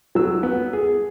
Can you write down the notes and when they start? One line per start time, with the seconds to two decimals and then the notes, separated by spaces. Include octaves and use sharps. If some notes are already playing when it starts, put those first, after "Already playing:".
0.15 F#3 E6
0.43 B3
0.73 G#4